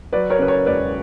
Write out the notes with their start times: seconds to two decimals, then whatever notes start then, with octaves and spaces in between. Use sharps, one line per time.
0.13 F#3 B4 D5
0.30 A#4 C#5
0.39 C#3 B4
0.48 A#4 C#5
0.66 E1 B4 D5